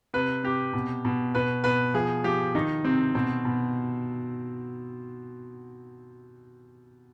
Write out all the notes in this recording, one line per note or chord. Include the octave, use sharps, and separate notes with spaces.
C3 B4
C3 G4
B2
B2
B2 B4
B2 B4
F3 G#4
F3 G4
D#3 D#4
C3 C4
B2 C4
B2